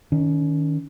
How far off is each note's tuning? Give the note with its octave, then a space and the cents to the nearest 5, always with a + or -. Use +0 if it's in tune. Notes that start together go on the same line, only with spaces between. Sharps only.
D#3 +0 C#4 +30